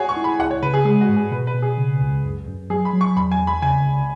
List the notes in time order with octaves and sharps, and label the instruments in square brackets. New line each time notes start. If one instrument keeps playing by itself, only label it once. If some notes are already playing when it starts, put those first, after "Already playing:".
Already playing: [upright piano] F#4 G#4 C#5 G#5
C#6
[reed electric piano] E4
[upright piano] B5
[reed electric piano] C#2 [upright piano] F#5
[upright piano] C#5
[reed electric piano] C#3 [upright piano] B4
[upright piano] G#4
[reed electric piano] G#3 [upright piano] G#4
[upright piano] F#4
[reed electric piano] G#2
[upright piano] G#4
[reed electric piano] B2 [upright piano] B4
[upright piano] B4
[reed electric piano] B2
[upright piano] G#4
[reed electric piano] C#3
C#2
F#2
F#2
[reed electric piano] F#3 [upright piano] G#4
[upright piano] B5
[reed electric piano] F#3
[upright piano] C#6
[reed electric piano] E2 [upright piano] B5
[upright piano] G#5
[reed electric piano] E2
[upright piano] B5
[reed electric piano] C#3 [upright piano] G#5
[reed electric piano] C#2